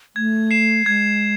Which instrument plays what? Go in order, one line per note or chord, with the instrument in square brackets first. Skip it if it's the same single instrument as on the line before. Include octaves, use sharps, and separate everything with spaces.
[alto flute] A3 [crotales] G#6
[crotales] C7 E7
[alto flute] G#3 [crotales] G#6